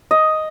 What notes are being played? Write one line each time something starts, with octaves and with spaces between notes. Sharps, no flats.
D#5